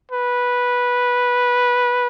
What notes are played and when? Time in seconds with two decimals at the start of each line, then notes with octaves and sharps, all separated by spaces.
0.11 B4